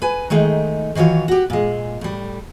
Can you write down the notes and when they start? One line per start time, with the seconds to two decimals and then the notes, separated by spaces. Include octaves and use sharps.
0.02 B4 G#5
0.30 D#3 G#3 A3 D#4
0.95 D#3 E3 F#3 F4 C#5
1.28 F#4 G4
1.50 A#2 G#3
2.01 A2 G3